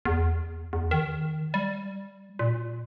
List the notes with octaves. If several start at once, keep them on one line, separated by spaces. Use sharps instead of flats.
E2
E2
D#3
G3
A#2